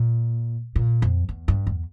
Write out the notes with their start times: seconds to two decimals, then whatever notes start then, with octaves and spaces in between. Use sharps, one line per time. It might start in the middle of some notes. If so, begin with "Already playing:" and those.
Already playing: A#2
0.76 A#2
1.02 F2
1.29 E2
1.48 G2
1.67 E2